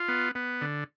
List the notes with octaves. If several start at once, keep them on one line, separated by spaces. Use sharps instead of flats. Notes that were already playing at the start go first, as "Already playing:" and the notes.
Already playing: F4
B3
B3
D3